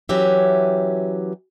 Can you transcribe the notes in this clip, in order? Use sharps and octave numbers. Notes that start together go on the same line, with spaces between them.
E3 F#3 C#4 G4 E5